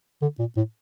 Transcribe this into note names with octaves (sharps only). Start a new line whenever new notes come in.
D3
A#2
A2